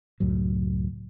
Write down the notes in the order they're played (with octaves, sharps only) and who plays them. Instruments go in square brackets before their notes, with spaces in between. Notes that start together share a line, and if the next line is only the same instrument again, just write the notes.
[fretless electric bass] C#2 F#2 A2 F#3